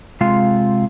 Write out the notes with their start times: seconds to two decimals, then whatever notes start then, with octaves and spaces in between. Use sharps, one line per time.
0.21 C3 G#3 F4 F5